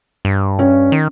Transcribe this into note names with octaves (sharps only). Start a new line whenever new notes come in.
G2
C#4
D#3